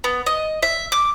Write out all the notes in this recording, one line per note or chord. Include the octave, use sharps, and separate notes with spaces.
B3
D#5
E5
D6